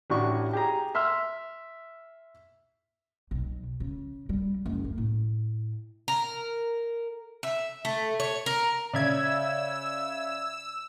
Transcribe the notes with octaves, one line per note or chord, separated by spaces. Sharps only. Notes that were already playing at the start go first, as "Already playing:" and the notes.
A1 D4 E4 F#4 C#6
G4 G#4 A#5
E5 C6 E6 F6
B1
C#3
G3
F#1
A#3
A2
A#4
E5
A3
C#5
A#4
C#3 D5 E5 E6 G#6